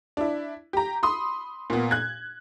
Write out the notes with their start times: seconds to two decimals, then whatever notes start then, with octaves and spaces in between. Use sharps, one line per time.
0.17 D4 E4
0.73 G4 A#5
1.03 B5 C6 D#6
1.70 A#2 A#3 B3
1.91 F#6 G#6